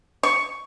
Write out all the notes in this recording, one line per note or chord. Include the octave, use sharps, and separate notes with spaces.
C#6